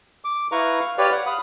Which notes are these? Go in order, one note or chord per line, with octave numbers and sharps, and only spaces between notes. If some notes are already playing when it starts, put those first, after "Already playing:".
D6
E4 B4 F5 A#5 C#6
F5
G4 B4 C#5 D5 F5
F#5
F5 B5 D#6